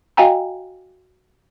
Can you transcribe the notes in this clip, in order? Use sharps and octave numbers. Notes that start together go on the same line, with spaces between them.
F#4 D#5 F5 G5 G#5 A#5